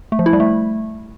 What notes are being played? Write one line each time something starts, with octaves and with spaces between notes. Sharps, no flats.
A3
F3
E4
G3
A3